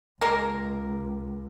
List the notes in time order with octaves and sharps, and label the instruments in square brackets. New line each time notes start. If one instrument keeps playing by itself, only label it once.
[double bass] C#2 [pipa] G#3 A#3 A#4